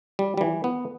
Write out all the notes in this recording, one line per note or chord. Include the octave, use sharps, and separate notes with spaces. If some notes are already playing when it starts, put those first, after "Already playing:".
G3
G3
E3
B3